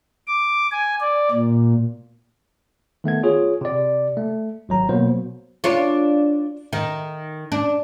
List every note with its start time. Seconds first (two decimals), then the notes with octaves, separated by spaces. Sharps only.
0.27 D6
0.72 G#5
1.01 D5
1.32 A#2
3.04 D#3 A3 B3 G#6
3.23 F4 G#4 C#5
3.61 C3 D5
4.17 A3
4.69 G#1 F#3 A#5
4.89 B2 F#3 A#3 B3 C5
5.64 D4 F4 C#5
6.73 D#3
7.52 D4